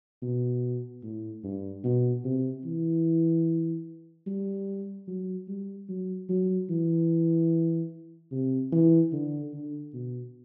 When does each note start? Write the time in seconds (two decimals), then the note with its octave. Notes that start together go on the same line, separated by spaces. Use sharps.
0.22 B2
1.03 A2
1.44 G2
1.84 B2
2.24 C3
2.65 E3
4.27 G3
5.08 F#3
5.48 G3
5.89 F#3
6.29 F#3
6.70 E3
8.32 C3
8.72 E3
9.13 D3
9.53 D3
9.94 B2